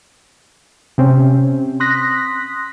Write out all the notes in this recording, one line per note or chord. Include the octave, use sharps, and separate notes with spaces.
C3 C4 C#4
C6 D#6 F#6 A#6 B6